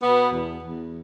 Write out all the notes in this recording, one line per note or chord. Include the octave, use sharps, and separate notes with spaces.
B2 B3
E2
E2